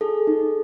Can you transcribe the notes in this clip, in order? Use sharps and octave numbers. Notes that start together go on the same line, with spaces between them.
G#4 A4
D#4